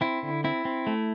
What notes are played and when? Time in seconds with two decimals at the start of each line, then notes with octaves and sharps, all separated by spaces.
0.01 C4 E4
0.23 D3
0.44 C4 E4
0.65 C4
0.87 A3